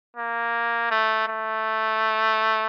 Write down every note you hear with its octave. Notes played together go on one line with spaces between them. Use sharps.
A#3
A3
A3